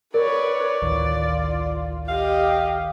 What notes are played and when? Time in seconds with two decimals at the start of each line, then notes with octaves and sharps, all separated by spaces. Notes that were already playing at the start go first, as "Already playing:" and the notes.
0.14 A#4 B4 C#5 D5
0.82 A1 D2 D#3 F4
2.08 G4 D#5 F5